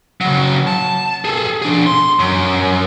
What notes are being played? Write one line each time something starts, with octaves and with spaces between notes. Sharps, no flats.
C#3 F#3
A5
G#4 A4
D4 G#4
C6
F#2